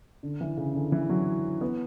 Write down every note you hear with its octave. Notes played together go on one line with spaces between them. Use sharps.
D3
E3
C#3
D3
E3
F#3
B3